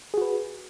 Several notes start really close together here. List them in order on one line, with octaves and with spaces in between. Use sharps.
G#4 F#4 B4